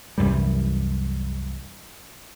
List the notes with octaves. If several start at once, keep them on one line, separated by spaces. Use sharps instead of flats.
C2 F#2 E3 G3